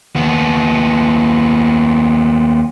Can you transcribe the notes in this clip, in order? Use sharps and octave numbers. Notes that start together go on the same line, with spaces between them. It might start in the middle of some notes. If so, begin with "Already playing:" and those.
D#2 B3